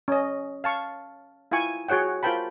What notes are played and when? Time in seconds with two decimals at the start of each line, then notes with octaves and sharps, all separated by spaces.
0.08 C#4 D#5
0.64 F5 A5 C#6
1.52 E4 F4 G5 G#5 C#6
1.89 F#4 G#4 C#5 F#5 G5
2.23 F4 A#4 C5 G5 A5 B5